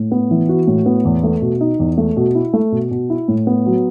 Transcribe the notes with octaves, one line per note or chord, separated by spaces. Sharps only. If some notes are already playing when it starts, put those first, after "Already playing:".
Already playing: A2
B3
E3
F#4
A2
B3
E2
A3
B2
D#4
E2
A3
B2
E4
A3
B2
B2
E4
A2
B3
F#3